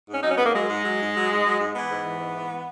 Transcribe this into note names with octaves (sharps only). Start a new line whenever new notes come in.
G#2
C#4
F#3 D#4
C#4
G#2 B3
A#3
F#3 G#3
G#2
F#3
G#2
F#3
G#2
F#3
G#2
E3 B3
G#2
E3
G#2
E3